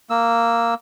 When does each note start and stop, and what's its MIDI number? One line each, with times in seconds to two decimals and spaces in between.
0.10 0.74 58
0.10 0.74 88